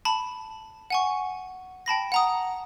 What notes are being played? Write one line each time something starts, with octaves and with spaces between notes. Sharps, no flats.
A5 B5
F#5 G#5 C#6
G5 A5 B5 A#6
F#5 A#5 D#6